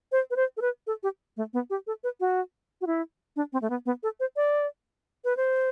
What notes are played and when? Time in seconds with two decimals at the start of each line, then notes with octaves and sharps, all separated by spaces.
0.12 C5
0.31 B4
0.36 C5
0.57 A4
0.61 B4
0.87 A4
1.03 G4
1.37 A3
1.53 B3
1.70 G4
1.87 A4
2.04 B4
2.20 F#4
2.81 F#4
2.87 E4
3.36 D4
3.53 C4
3.62 A3
3.70 B3
3.86 B3
4.03 A4
4.20 C5
4.36 D5
5.25 B4
5.37 C5